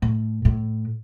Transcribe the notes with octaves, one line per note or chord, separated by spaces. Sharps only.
A2
A2